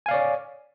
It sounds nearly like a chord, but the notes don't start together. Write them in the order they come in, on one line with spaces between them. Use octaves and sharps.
G#5 F5 D5 C#5